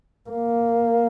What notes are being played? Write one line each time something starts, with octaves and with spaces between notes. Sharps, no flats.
A#3